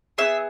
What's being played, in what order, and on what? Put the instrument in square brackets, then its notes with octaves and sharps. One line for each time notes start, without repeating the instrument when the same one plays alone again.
[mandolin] B3 D#4 G#4 E5